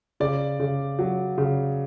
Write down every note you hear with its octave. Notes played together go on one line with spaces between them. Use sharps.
C#3 D5
C#3
F#3
C#3